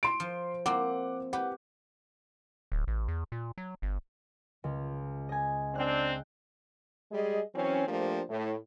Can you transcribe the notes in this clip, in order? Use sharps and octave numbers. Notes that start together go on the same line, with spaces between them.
C6 D7
F3
A#3 C4 F#5 D6
G4 B4 F#5
D1
A1
E2
A#2
F#3
G1
C#2
D#5 G#5
C4 D4 G5 F6 F#6
G3 G#3 G#4 D#5
E3 F#3 C4 C#4
F3 A3 A#3 D4 G4 C5
A2